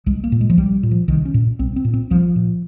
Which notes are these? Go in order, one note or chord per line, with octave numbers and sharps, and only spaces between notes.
C2 G#3
A#3
A#2
G#3
F3
C2 G3
A#2
F3
C2 D#3
C#4
A#2
C2 C4
C4
A#2
C4
C2 F3
A#2